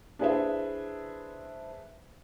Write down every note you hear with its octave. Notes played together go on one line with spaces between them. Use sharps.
D4 E4 G#4 B4 C5 E5